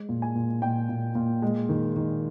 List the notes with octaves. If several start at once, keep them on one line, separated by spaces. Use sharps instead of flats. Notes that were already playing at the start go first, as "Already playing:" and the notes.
Already playing: G#3
A#2
G#5
A#2
A#2 G5
A#2
A#2
G#3
D#3
D#3